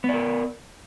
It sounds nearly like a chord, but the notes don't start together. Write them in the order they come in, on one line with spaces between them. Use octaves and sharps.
B3 D5 A#4